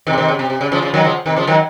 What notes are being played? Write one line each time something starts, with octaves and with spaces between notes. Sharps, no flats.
C3 D#3
C#3
C3 D#3
C#3
C3
C3
C#3
C#3 F3
C#3 F3
D#3 F#3
C#3 F3
C3 D#3
C#3 F3
D#3 F#3